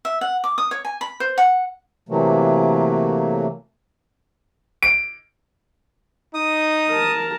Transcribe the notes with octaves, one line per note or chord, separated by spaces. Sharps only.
E5
F#5
D6
D#6
C#5
G#5
B5
C5
F#5
C3 E3 F#3 A3 A#3
D7
D#4 D#6
A#4 A5